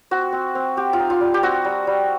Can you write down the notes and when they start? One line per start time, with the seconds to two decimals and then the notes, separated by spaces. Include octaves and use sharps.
0.11 C4 F#4
0.33 C4
0.55 C4
0.77 C4 G4
0.93 F4
0.99 D#4
1.10 F4
1.21 G3
1.34 G4
1.43 C4 F#4
1.65 G3
1.87 G3